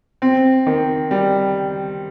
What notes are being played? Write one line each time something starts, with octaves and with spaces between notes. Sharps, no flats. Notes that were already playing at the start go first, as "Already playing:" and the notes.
C4
D#3
G3